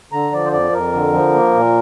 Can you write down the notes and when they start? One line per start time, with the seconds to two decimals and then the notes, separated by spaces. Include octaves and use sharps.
0.12 D3 A#5
0.32 F3 D5
0.45 C5
0.52 F2 D5
0.72 F2 A#4
0.93 D3
1.13 F3
1.34 A#3
1.54 A#2